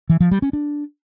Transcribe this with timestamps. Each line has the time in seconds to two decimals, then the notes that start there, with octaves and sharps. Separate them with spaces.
0.10 E3
0.20 F3
0.31 G3
0.42 C#4
0.53 D4